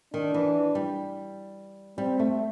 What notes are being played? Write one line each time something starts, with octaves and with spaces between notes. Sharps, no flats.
D#3 D4
E3
G3
G3 C4
A3